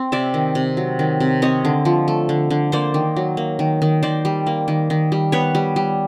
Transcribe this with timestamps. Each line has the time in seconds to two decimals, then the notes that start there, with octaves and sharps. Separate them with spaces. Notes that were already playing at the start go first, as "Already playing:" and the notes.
Already playing: C4
0.12 C3 D5 E5
0.34 D#3
0.55 C3
0.77 F#3
0.99 D#3
1.20 C3
1.42 C4 C#5 D#5
1.65 D3
1.85 F3
2.08 A3
2.29 D3
2.50 D3
2.72 A#3 C5 D5
2.94 D#3
3.16 F#3
3.37 A#3
3.59 D#3
3.82 D#3
4.03 D#3 C5 D5
4.25 G3
4.47 A#3
4.68 D#3
4.90 D#3
5.12 G3
5.32 B3 B4 C#5
5.55 G3
5.76 G3